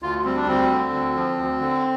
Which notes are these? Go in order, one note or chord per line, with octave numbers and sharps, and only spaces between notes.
D2 F4
G3 C4
D4
D2 C4
D3
D2
F3
D2
D3